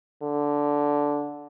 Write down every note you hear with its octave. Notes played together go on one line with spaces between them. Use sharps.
D3